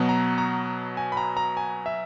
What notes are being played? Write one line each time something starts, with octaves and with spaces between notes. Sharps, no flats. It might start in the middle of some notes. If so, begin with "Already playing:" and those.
Already playing: B2 F#3 B3 F#5
A#5
A#5
G#5
B5
A#5
A#5
G#5
E5